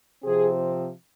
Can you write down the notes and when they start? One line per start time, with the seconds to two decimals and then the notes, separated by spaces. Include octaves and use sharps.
0.22 C3 F3 C4 G#4